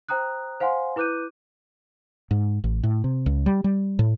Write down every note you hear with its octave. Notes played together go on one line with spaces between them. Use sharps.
C5 G5 A#5 D#6 F#6
C5 F5 F#5 G#5 C6
E4 B4 D6 F#6 G6 D#7
G#2
A1
A2
C3
C#2
G3
G3
A2